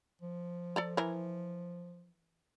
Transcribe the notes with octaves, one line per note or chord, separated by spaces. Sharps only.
F3
A4 D5 A#5
E3 A#4